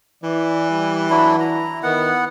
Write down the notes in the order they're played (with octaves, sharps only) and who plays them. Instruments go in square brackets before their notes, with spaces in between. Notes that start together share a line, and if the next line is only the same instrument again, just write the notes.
[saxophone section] E3 [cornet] D5
[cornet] G3
[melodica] F#3 D4 E4 [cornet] B5
[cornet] E4 [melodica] A#5
[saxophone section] D#3 [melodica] B3 F#5